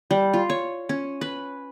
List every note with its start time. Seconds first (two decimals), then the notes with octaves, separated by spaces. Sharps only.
0.11 G3
0.34 F4
0.50 C#5
0.89 C#4
1.21 B4